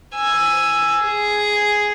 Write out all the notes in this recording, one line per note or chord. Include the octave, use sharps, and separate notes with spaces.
G#5 E6
G#4